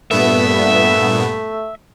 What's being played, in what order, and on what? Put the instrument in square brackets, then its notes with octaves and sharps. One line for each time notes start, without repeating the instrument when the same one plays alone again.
[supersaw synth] G2 A#2 B3 [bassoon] A3 [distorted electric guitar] E5